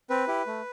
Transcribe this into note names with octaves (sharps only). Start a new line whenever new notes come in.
C4 B4
E4 G4
A3